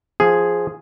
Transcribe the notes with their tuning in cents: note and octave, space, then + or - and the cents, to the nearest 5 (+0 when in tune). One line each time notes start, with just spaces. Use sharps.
F3 +0 G#4 +0